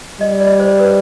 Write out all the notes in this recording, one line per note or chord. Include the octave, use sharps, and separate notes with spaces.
G3 D#5
D5
C5
B4